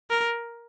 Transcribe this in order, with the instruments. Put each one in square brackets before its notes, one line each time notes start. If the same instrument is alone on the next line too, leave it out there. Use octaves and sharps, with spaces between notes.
[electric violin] A#4